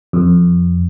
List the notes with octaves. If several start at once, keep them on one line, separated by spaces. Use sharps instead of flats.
F2